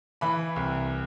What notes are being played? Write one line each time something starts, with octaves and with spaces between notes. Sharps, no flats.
E3 B5
C2